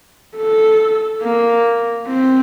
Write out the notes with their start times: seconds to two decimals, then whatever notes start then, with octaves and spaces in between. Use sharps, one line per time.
0.36 A4
1.22 A#3
2.07 C4